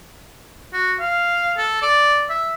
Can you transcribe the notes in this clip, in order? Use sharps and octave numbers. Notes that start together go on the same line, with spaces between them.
F#4
F5
A4
D5
E5